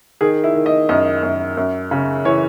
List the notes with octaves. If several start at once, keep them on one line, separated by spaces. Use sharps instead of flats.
D#3 G#4
E4
D#3
D#5
F#2 D#5
F#2
F#2
C#3
E3 C#5